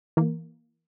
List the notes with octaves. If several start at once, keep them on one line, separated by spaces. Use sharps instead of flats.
E3 A#3